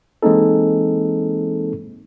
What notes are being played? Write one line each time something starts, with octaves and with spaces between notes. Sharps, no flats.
E3 G#3 A#3 C4 D#4 A4